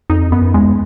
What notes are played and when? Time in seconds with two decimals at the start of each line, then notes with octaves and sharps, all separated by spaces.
0.10 F2 D#4
0.32 F#2 B3
0.54 E2 G#3